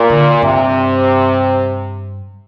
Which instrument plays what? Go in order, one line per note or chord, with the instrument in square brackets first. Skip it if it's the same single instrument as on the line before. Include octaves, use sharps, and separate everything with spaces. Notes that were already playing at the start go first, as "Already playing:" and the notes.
Already playing: [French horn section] A#2
[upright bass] D3
[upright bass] G2 [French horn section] C3